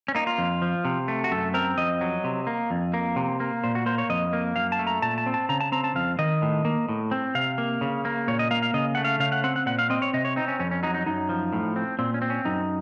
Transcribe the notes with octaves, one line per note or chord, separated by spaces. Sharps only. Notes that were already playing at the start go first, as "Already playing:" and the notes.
C#4
A#3 D#4
F4
F2
F3
C3
A3
F#4
F#2 A4
C4 A#4
F2 D#5
F#3
C3
A#3
F2
A#3
C3
A#3
A#2 C5
F#4
A#3 C5
C#5
F2 D#5
A#3
F#2 F5
A5
A3
A#5
A#2 A5
A5
C4
A5
C#3 A#5
A5
C4 A#5
A5
F2 F5
D#3 D#5
A2
A#3
A2
C4
C3 F5
A#3
C#3
A#3
A#2 C#5
D#5
A#3 F5
F5
C#3 D#5
A3 F#5
F5
C#3 F5
F#5
C4 F#5
F#5
A#2 F#5
F5
C4 D#5
C#5
C3 D#5
C#5
C4 D#4
C#4
F2 C#4
C#4
F#3 D#4
D#4
F#2 D#4
F3
A2
C4
A#2 C4
C#4
C4
C#4
F#2 D#4